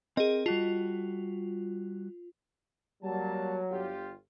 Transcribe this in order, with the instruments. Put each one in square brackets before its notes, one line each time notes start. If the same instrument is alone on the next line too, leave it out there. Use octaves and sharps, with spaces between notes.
[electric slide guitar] C4 A#4 [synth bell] G#4 D#5
[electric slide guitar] G3 F#4 A5 [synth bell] F4
[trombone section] F#3 [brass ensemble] G3 A#3 A5
[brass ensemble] G1 F4 G4